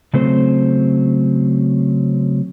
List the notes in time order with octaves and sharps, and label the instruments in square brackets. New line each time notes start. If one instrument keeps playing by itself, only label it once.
[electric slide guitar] C#3 F#3 A3 C4 A4 C5